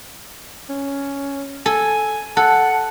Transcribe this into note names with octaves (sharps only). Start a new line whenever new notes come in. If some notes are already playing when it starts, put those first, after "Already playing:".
C#4
A4 G#5
A4 F#5 A5